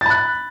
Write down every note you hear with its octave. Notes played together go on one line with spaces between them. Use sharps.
B5 F#6 A6